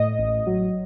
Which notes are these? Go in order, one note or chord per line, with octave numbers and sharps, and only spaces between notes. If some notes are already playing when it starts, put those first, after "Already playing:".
Already playing: A2 D#5
A1
F#3